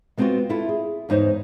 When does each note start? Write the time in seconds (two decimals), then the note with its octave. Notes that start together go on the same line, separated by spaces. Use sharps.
0.18 G#3 B3 C4 D4 F4 F#4
0.49 E4 F4 A4 E5
0.69 G#4
1.09 E2 G#2 D#4 C5 C#5